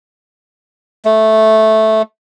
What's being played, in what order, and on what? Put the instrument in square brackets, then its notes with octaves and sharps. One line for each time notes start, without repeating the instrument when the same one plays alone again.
[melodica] A3